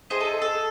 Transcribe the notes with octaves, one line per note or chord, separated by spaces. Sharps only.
D#4 G#4 C5
A4
A4